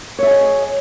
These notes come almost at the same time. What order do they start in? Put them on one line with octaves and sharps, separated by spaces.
C#5 E5 G#4 D#5